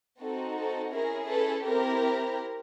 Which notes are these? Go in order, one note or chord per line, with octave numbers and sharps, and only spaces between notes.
C4 D#4 F#4 A4
A4
C#4 E4 G#4 A#4
A4 B4
C4 E4 G4 A#4